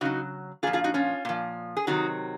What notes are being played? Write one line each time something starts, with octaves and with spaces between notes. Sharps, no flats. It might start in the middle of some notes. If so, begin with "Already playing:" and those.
C#3 F#3 D#4 F#4
A#2 F3 F4 G#4
F4 G#4
D#4 F#4
C#4 F4
A#2 F3
G#4
C3 D#3 F#3 D#4 F#4